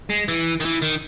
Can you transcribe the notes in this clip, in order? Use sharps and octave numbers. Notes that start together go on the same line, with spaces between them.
G#3
E3
D#3
E3
D#3